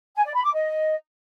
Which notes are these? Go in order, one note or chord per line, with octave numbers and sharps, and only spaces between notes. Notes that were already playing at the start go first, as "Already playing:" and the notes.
G#5
D5
B5
D6
D#5